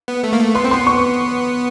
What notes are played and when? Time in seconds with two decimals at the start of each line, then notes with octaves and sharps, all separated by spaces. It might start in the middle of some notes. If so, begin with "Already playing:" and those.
0.08 B3
0.24 A3
0.33 A#3
0.40 A3
0.55 B3 C6
0.64 C4
0.71 B3 C6
0.87 C#6